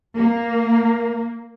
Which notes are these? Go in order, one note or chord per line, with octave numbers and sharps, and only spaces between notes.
A#3